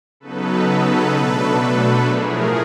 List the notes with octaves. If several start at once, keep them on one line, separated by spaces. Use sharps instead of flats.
C#3 F#3 B3 D#4 A4 B4
B2 F#3 A3 D4
A2 F3 A3 G#4 A#4